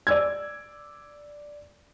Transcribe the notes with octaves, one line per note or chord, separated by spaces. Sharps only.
D5 E6 G#6